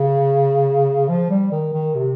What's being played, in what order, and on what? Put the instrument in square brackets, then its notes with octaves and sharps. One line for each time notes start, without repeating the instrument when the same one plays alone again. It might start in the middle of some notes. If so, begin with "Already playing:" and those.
Already playing: [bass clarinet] C#3
F3
G3
D#3
D#3
C3